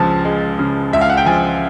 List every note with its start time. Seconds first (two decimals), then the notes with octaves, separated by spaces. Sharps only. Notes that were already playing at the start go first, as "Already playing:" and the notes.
Already playing: C#2 C#3 F3 A5
0.25 G#3
0.59 C#3
0.93 C#2 E5
1.01 F5
1.10 F#5
1.17 G5
1.26 F3 G#5